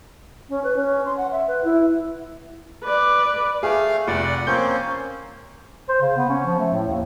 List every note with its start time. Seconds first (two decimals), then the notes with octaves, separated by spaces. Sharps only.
0.49 C#4
0.63 B4
0.76 C#4
1.05 C6
1.17 F#5
1.31 E5
1.47 B4
1.63 E4
2.84 B4 D5
3.63 A3 G#4 F5
4.08 F1 D5 F#5
4.47 A#3 C4 C#4 G6
5.89 C5
6.01 C#3
6.17 B3
6.29 C#4
6.45 F3
6.59 A3
6.73 A2
6.88 D#2